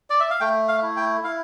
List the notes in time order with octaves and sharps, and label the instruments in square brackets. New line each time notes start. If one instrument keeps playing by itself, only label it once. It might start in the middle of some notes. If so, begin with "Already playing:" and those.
[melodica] D5
E5
F5
A3 G5
F5
E4
G5
E4 F5